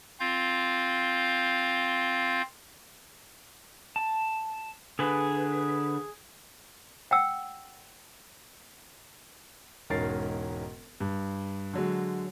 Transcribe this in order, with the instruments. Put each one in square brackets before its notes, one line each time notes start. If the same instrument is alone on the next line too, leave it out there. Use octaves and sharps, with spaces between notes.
[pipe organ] C4 F4 F5 G6
[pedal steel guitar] A5
[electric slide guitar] D3 B4 [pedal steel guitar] G#4
[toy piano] F#5 G5 E6
[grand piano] E1 G#2 C#4 A#4 A6 C7
G2
D3 F#3 G#3